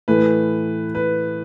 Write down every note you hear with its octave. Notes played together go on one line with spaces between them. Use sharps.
A2 E3 A3 B4
B4